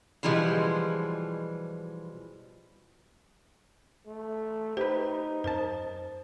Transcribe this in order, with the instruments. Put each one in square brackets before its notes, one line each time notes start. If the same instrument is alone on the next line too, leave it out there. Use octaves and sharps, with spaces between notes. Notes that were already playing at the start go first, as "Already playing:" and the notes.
[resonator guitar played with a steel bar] B2 E3 F3 G3 G#3
[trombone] A3
[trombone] D#4 [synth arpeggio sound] G4 B4 [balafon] C5
[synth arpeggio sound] F#2 A#4 A5 [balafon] C5